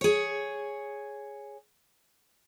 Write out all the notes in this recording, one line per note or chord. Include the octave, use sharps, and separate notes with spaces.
G#4 C#5